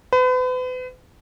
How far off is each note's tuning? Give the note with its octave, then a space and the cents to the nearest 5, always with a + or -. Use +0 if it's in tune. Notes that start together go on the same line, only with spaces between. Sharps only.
B4 +40